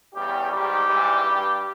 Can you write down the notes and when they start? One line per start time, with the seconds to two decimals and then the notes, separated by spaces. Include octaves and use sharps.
0.15 E2 C#3 G3 G4
0.50 G#2 D#3 G3 G4
0.86 G#2 E3 G3
1.23 G2 G3